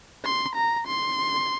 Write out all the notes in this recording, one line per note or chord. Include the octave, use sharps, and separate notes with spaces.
C6
A#5
C6